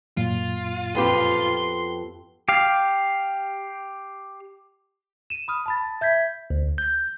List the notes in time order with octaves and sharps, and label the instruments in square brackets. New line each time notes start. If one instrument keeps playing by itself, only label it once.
[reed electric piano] F#2 A#2 [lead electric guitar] F4
[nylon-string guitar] F2 B3 G4 [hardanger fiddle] C6
[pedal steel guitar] G4 F5
[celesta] D#7 E7
B5 D#6 F6
A5 B5 A6
E5 G6 G#6 B6
[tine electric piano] D2
G6